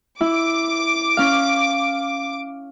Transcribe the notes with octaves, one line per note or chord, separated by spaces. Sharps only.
E4 D6
C#4 F5